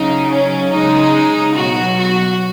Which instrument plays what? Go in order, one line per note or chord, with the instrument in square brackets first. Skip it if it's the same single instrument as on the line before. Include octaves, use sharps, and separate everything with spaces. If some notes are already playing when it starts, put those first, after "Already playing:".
Already playing: [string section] C#3 F#3 D#4
C#4
C#3 G#3 D#4
B2 F#3 F#4
F#4